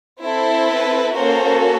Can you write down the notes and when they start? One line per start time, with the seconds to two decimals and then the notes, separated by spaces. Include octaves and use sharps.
0.22 C4 E4 A4
0.69 B4
1.14 A#3 C#4 F#4 A4 A#4 C5